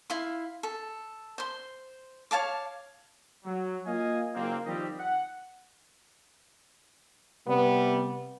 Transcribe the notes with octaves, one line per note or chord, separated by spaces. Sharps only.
E4 F5 C6
A4
C5 C6
C#5 F5 A5 D6
F#3
A#3 F4 D#5 F5 G#5
F#1 A#3 C4
D#3 F3 G3 C4 G4 D#5
F#5
C3 G3 B3